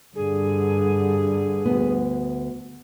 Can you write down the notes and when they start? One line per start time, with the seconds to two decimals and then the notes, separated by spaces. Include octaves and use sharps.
0.15 G2 D3 G#4
1.65 D2 B3